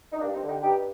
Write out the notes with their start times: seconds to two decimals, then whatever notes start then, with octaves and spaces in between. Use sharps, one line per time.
0.13 D#4
0.21 G2 A#3 D4
0.34 C4 D#4
0.42 D3
0.49 D#4 G4
0.63 G2 D#4 G4